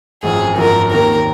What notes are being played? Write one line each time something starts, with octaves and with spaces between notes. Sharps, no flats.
G#1 F#2 F3 G#4
G#1 F#2 F3 A#4
D#2 D#3 A#3 A#4